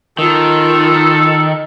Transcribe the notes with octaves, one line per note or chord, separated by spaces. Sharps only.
D#3 F4 A4